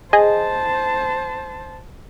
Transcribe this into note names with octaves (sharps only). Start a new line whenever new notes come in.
G#4 C5 D#5 A5